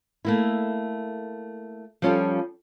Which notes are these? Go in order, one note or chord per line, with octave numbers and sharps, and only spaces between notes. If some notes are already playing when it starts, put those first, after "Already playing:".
A3 A#3 E4
F3 G3 C#4 F4 G4 A4